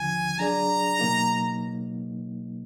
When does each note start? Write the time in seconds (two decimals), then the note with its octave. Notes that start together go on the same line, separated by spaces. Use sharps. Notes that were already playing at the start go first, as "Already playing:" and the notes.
Already playing: D#2 D3 F3 G#5
0.38 F#3 D4 G#4 D5 A#5
0.99 B2 F#3 A#3 D#4